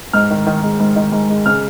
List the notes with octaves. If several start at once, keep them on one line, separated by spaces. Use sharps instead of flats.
G#2 F6
D#3
D#3
G#3
G#2
D#3
G#2
G#3
C#3 F6